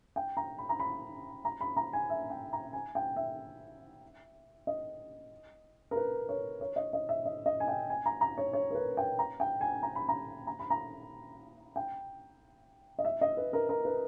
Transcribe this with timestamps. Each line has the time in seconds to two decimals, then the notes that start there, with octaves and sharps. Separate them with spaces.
0.16 G5
0.37 A#5
0.58 B5
0.69 A#5
0.80 B5
1.45 A#5
1.61 B5
1.77 A#5
1.93 G#5
2.10 E5
2.30 G5
2.53 A#5
2.73 G#5
2.95 G5
3.16 E5
4.67 D#5
5.91 A#4
5.96 B4
6.29 C#5
6.61 C#5
6.76 D#5
6.93 D#5
7.09 E5
7.25 D#5
7.46 D#5
7.60 G#5
7.68 G5
7.90 G#5
8.06 A#5
8.21 A#5
8.38 C#5
8.53 C#5
8.71 A#4
8.75 B4
8.97 G5
9.19 A#5
9.40 G5
9.61 G#5
9.83 A#5
9.96 B5
10.09 A#5
10.47 A#5
10.59 B5
10.70 A#5
11.76 G5
12.99 D#5
13.05 E5
13.21 D#5
13.37 B4
13.53 A#4
13.69 A#4
13.85 B4